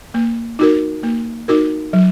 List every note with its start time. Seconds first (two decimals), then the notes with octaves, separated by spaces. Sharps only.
0.14 A#3
0.59 D#4 F#4 A#4
1.03 A#3
1.48 D#4 F#4 A#4
1.93 F#3